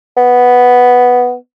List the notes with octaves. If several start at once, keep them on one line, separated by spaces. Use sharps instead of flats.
B3